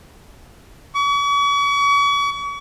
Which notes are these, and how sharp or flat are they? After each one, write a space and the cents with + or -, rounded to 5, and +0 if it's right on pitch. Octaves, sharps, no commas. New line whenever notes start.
C#6 +40